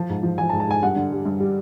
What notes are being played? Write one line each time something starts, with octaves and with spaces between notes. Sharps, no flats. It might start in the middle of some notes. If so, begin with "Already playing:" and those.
Already playing: F3 A5
G#2
F3
F3 G#5
A5
G#2
A5
G#2 G#5
G2 F#5
D3
G3
G2
G3